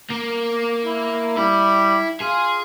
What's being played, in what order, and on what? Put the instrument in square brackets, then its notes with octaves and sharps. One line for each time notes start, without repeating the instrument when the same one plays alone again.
[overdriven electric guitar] A#3
[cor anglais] E4
[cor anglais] G3 [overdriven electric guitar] E4
[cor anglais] F4 [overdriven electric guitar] G#4